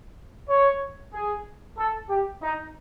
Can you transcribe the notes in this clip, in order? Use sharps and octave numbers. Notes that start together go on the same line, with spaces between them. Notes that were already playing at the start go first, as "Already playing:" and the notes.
C#5
G#4
A4
G4
D#4